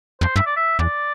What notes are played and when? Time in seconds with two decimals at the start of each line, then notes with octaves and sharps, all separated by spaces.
0.21 F2 C5
0.36 G2 E5
0.46 D5
0.56 E5
0.79 E2 D5